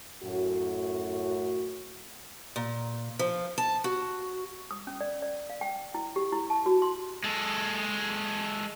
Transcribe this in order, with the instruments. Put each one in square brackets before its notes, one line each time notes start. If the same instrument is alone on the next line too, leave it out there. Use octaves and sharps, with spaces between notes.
[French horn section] F#2 A2 F#4
[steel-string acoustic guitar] A#2
F3
A5
F#4
[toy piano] D#6
C#4
D5
D5
F5
G5
E4
G4
E4
A5
F#4
C6
[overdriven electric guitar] G#3 A4